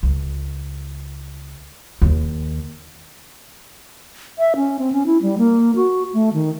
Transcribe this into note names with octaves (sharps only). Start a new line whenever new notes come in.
C#2
D#2
E5
C#4
C4
C#4
E4
G3
A#3
F#4
A3
D#3